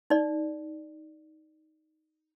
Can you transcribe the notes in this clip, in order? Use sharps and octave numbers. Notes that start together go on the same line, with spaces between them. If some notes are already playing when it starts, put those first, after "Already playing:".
D#4 D5